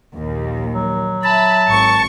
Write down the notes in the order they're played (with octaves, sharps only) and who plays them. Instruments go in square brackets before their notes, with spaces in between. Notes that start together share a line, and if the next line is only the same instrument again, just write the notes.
[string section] A#1 D#2
[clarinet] F#3
[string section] E5 B5 [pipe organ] A5
[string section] G#1 C#6 C#7